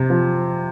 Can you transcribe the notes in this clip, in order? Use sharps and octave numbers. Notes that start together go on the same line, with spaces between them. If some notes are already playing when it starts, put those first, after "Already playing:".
Already playing: C3
F3